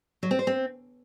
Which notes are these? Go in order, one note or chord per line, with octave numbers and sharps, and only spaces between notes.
F#3
C4
C5
C4